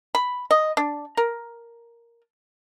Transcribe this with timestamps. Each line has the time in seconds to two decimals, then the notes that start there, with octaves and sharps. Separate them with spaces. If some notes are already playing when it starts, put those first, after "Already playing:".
0.15 B5
0.51 D#5
0.77 D4
1.17 A#4